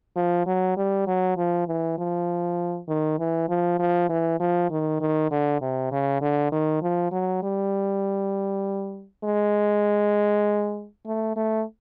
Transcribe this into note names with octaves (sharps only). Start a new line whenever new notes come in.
F3
F#3
G3
F#3
F3
E3
F3
D#3
E3
F3
F3
E3
F3
D#3
D#3
D3
C3
C#3
D3
D#3
F3
F#3
G3
G#3
A3
A3